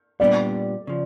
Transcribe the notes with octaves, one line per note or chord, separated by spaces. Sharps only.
A#2 G3 B3 D4 G4 D5
C#3 F3